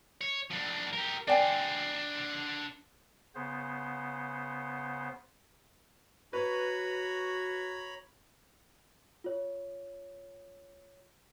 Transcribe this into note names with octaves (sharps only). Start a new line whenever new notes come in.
C#5
F3 D4
G4 A#4
D4 C5 D5 G5 G#5
C#3 B3 C5
F#4 B4 C#5 A#5 B5
F4 C#5